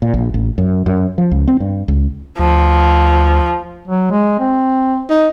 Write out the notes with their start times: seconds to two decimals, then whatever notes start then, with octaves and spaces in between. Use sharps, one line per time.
0.02 A#2
0.14 A#1
0.34 A1
0.58 F#2
0.86 F#2
1.18 F3
1.31 C#2
1.48 C4
1.60 G2
1.88 C#2
2.39 D2 F3
3.88 F#3
4.11 G#3
4.39 C4
5.10 D#4